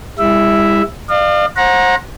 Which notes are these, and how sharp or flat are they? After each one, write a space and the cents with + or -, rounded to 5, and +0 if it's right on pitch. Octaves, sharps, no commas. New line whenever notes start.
G3 +45 E4 +0 E5 +0
D5 +45 F5 +0
C5 +30 F#5 -25 A#5 +10